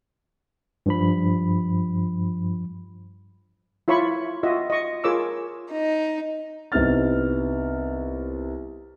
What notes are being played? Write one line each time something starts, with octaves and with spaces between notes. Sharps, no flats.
G2 F3 B5
E4 F4 C#5 B5 C#6
F4 F#4 D#5 E5
D#5 C#6
F4 G#4 A#4 C#5 D6 E6
D#4
C2 B3 C4 D#4 F6 A6